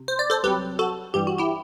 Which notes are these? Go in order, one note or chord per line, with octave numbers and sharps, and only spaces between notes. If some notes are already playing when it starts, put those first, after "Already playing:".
Already playing: C3
C5
D5
A4 C5
C2 C3 F#3 G4 B4
F#4 A4
G2 E3 G3 G4
F#4
E4 G4